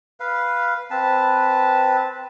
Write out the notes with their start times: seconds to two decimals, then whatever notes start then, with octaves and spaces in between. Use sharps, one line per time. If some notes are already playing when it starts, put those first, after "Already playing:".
0.20 B4 F5
0.91 C4 B4 A5